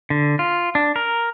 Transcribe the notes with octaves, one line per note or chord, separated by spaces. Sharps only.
D3
F4
D4
A#4